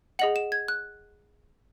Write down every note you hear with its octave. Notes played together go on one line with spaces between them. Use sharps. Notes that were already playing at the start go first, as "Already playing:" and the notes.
G#4 D#5 F#5 F#7
E7
G#6
F#6